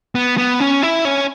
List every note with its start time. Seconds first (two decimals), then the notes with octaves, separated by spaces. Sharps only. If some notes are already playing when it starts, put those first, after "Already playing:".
0.15 B3
0.38 B3
0.60 C#4
0.83 E4
1.05 C#4